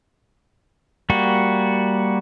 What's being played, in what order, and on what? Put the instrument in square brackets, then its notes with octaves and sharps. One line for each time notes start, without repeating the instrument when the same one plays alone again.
[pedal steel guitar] G3 A#3 F#4